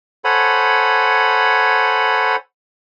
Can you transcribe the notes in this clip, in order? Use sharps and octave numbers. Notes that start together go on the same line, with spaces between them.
A4 C5 C#5 F#5 G#5 B5